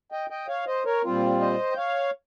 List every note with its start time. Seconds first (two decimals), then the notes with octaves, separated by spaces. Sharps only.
0.12 D#5 G5
0.30 D#5 G5
0.48 C#5 F5
0.67 C5 D#5
0.85 A#4 C#5
1.04 A#2 G3 C4 F4
1.41 C5 D#5
1.71 G5
1.77 C#5 F5